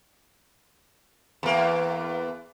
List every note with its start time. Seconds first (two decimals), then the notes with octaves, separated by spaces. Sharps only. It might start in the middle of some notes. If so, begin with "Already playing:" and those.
1.43 E2 A#3